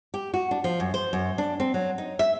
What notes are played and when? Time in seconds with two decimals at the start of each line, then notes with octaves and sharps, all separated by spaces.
0.14 G4
0.34 F#4
0.51 D4
0.64 F3
0.80 F#2
0.94 C5
1.13 F#2
1.38 D4
1.60 C4
1.74 F#3
1.98 D#4
2.19 E5